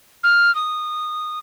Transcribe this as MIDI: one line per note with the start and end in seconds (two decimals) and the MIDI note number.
0.24 0.54 89
0.55 1.39 87